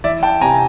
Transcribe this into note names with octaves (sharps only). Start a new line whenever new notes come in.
E3 D5 E5
G5 A5
C3 G#5 A#5